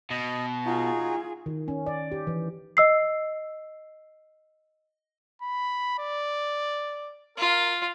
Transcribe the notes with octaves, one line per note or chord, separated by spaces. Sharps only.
B2 D#5
D#4 F4 F#4 G#4
D#3
C#4
D5
G4
E3
D#5 E6 C7
B5
D5
F4 A#4